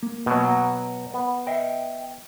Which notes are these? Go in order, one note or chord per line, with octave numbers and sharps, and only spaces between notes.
A#3
B2 F#3
F#5 A#5
B3
D#5 E5 G5